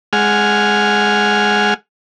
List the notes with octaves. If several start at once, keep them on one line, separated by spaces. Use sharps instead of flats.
G#3 F#5 G#5 F6